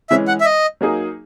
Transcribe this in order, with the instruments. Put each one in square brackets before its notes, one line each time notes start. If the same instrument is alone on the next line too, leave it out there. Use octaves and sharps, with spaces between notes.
[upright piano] E3 G#3 C#4 [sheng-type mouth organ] E5
[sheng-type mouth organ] F#5
E5
D#5
[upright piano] F#3 A#3 D#4 G#4